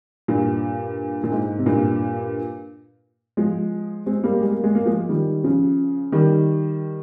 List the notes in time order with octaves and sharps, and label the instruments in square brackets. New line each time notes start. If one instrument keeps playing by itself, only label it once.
[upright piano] G2 A#2
A#2
G#2
C3
G2 A#2
F3 G#3
G#3 C4
G3 A#3
G#3
A#3
G#3
A#3
F3 G#3
D#3 G3
C#3 F3
D#3 G3